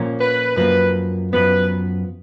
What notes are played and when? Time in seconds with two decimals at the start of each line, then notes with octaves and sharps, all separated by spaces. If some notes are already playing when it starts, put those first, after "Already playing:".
Already playing: A#2 F3 A#3 C#4
0.19 B4
0.56 F#2 F3 A#3 B4
1.32 F#2 F3 B3 B4